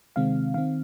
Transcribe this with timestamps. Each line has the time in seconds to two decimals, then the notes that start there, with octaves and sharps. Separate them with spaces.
0.16 C3 D#3 G#3 C4 F5
0.54 D#3 C4 F5